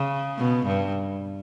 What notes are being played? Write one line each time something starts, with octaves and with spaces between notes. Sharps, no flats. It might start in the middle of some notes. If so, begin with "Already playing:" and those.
Already playing: C#3
B2
G2